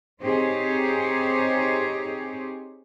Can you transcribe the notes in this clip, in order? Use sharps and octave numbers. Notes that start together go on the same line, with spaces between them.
C4 D#4 G4 G#4 C5 C#5